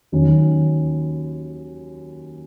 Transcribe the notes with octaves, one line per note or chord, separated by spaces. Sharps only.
D#2 D#3 F#3 C#4